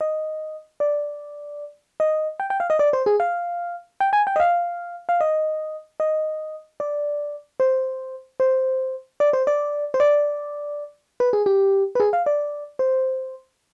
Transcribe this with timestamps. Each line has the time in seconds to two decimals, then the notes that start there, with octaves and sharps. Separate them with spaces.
0.01 D#5
0.80 D5
2.00 D#5
2.40 G5
2.50 G5
2.60 F5
2.70 D#5
2.79 D5
2.93 C5
3.06 G#4
3.20 F5
4.00 G5
4.13 G#5
4.27 G5
4.36 D#5
4.40 F5
5.09 F5
5.21 D#5
6.00 D#5
6.80 D5
7.60 C5
8.40 C5
9.20 D5
9.33 C5
9.47 D5
9.94 C5
10.00 D5
11.20 B4
11.33 G#4
11.46 G4
11.95 B4
12.00 G#4
12.13 F5
12.26 D5
12.79 C5